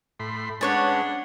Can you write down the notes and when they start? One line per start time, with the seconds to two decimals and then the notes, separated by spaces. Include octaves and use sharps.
0.20 A2 B5 C6
0.61 G#3 C#4 D4 B4 C#5 F#5 A5